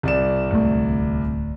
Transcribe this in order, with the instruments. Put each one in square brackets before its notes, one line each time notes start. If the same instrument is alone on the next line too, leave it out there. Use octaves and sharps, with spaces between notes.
[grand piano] C2 D5 E7
[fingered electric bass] D1 D2 A3